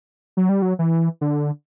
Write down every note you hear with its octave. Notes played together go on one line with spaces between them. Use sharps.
F#3
G3
F#3
E3
D3